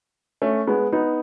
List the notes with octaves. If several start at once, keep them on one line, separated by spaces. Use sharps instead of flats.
A3 C#4
G#3 B3
B3 D#4